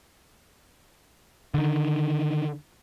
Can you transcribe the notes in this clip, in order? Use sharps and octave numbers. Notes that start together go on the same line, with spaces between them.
D3 D#3